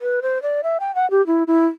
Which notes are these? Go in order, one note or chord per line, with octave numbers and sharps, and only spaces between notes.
B4
C5
D5
E5
G5
F#5
G4
E4
E4